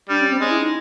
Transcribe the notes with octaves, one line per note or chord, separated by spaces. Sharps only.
G3 D4
C#4
C4
G#3 C#4
E4
D#4